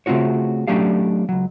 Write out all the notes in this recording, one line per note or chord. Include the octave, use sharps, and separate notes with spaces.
C#3 A3 C4 F4 F#4 C#5
F#3 A3 C#4 D4 G4 F5
C#2 F#3